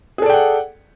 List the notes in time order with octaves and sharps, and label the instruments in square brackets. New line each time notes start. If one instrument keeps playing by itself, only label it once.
[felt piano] G#4
A4
D5
G5
F#5